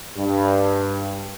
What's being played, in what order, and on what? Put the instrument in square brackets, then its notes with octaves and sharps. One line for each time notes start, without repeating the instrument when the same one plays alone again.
[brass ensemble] G2